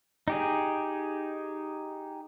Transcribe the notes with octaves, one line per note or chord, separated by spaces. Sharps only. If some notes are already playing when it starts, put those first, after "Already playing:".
D#4 G4 G#4